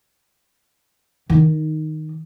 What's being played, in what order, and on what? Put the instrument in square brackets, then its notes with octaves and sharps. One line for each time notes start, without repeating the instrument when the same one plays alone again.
[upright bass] D#3 D#4